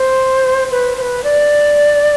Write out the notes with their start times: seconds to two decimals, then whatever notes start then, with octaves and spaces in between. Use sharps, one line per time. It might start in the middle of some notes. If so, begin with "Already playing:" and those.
Already playing: C5
0.71 B4
0.98 C5
1.01 B4
1.24 D5